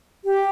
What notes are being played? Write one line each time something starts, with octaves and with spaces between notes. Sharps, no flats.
G4